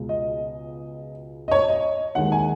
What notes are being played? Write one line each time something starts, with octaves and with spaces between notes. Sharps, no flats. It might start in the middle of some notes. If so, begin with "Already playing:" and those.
Already playing: C#2 B2 G#3
D#5
D#5
C#5
D#5
D#2 D#3 G#3 F#5
G#5